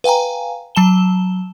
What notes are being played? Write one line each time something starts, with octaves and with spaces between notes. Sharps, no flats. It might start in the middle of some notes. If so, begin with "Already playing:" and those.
B4 F5 G5 G#5 A#5
F#3 A5 E7 G7